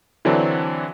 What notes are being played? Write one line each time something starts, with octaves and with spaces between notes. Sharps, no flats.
D3 E3 F#3 C4 D4